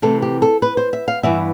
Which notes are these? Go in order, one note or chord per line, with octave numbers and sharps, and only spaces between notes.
C3 E3 A3 C4 A4
G4
A4
B4
C5
E5
F5
G2 E3 B3 E5